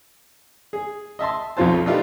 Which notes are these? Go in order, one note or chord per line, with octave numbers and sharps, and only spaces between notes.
G#4
D#5 E5 A5 C6
B1 F2 F3 F4 C5 A5
A3 D4 D#4 F4 G4 B4